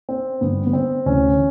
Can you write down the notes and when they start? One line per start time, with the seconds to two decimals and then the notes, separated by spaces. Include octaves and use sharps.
0.09 C4
0.41 G2 D3 B3
0.66 B3
0.73 C4
1.06 D2 C3 E3 C#4